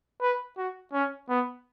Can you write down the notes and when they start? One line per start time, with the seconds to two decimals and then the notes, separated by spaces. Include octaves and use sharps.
0.21 B4
0.57 F#4
0.93 C#4
1.29 B3